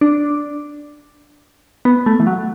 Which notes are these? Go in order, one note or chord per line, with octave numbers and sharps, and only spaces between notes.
D4
B3
A3
E3
F#3